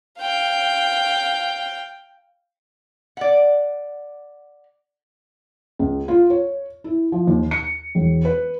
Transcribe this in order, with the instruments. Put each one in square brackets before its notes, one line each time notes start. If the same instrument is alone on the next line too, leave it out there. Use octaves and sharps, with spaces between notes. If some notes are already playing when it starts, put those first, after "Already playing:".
[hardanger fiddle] F5 G5
[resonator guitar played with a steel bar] D5 F#5
[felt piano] C#2
F4
C#5
E4
F3
D#2
C#7
E1
B4